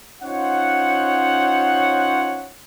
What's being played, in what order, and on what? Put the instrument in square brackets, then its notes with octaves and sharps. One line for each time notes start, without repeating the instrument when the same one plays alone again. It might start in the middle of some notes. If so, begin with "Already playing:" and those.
[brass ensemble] C#4 D#4 F4 C5 C#5 F#5